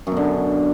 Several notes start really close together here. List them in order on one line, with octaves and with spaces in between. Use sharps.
F#2 B2 D3